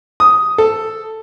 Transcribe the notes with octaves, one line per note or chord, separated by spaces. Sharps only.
D#6
A4